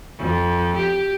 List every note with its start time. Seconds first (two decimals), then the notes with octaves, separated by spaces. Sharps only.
0.18 F2
0.77 G4